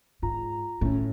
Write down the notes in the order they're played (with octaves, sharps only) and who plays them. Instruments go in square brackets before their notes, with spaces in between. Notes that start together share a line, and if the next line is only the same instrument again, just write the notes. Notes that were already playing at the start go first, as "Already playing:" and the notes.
[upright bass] G#2 [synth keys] F4 A#5
[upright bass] A2 [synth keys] A3 C#4